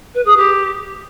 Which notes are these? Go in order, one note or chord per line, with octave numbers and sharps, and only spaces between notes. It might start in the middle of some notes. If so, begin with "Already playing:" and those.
B4
G#4
G4